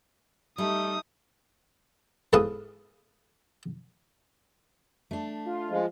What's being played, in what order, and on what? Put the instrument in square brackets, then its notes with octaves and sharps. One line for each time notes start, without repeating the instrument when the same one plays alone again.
[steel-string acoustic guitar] G3 [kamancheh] A3 D#4 [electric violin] D#6
[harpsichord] E2 G#2 A4 B4 F5 D#6
[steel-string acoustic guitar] A3 D4
[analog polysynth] F4
[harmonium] F3 G#3